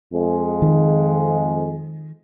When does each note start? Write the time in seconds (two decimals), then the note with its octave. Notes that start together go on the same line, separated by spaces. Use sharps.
0.12 F2 G#3
0.62 D#3